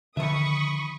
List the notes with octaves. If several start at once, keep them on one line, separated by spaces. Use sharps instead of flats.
D3 D#3 F3 D4 E5 B5 C#6 D#6